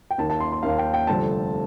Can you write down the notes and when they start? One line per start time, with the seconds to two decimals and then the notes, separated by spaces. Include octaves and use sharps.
0.11 G5
0.18 D#2 D#3 A#3 A5
0.30 A5
0.40 C6
0.52 C6
0.63 D#2 D#3 A#3 F5
0.78 G5
0.94 G5
1.07 F1 F2 D3 G3 C4 A5